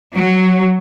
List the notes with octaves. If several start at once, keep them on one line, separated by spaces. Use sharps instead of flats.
F#3